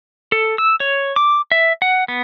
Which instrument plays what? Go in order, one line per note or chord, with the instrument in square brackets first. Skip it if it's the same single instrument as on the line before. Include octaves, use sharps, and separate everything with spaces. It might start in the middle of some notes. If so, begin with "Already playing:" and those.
[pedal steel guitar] A4
E6
C#5
D6
E5
F#5
B3